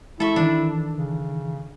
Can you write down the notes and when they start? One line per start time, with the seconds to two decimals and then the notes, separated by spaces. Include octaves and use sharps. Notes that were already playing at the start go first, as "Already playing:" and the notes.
0.20 G#3 E4 A4 E5 C#6
0.36 D#3 E3 D4
0.97 C#3